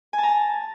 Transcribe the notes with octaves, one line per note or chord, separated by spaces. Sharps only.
G#5
A5
A#5
A5